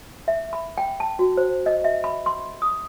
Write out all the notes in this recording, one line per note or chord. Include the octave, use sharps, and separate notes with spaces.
E5
B5
G5
A5
F#4
C5
D#5
E5
B5
C6
D#6